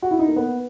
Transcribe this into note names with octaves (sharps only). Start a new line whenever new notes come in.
F#4
E4
D#4
A#3
B3